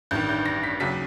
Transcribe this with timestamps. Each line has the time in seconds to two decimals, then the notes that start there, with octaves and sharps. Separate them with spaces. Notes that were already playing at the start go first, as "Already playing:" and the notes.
0.11 A1 G2 D#3 G6
0.29 G6
0.46 A#6
0.63 B6
0.80 D#2 C#3 F#3 B6